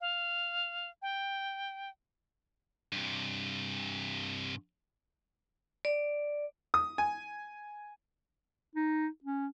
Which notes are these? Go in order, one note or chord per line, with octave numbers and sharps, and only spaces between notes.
F5
G5
G2 C3
D5
D#6
G#5
D#4
C#4